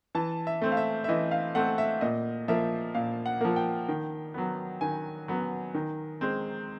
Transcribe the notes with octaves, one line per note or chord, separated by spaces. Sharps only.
E3 A5
E5
A3 C4
F5
E5
E5
E3 D#5
F5
A3 C4 F#5
E5
A#2 D#5
F3 A#3 E5
A#2 F5
F#5
F3 A#3
G5
D#3
F#3 B3
D#3 G#5
F#3 B3
D#3
G#3 C4